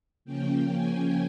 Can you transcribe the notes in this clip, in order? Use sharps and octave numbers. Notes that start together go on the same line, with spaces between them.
C#3 F3 A#3 C#4 G5
G#5